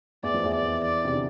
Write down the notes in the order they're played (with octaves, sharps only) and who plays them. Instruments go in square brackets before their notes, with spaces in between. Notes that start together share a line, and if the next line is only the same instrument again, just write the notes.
[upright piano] E2 E3 [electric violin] D5
[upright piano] F2 F3
E2 E3
[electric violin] D5
D5
[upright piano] C3
D3